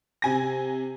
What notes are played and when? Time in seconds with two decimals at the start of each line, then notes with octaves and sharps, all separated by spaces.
0.22 C3 G#5 A#6